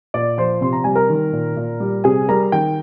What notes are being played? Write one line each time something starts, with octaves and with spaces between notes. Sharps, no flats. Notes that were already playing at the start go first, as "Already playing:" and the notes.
A#2 D5 D6
F3 C5 C6
C3 C6
A#5
G3 G#5
A#4 A#5
D#3
A#2
A#2
G3
C3 G#4 G#5
G3 A#4 A#5
D#3 G5